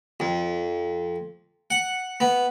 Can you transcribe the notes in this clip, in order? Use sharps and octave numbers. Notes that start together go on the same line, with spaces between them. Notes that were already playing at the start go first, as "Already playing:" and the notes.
F2
F#5
B3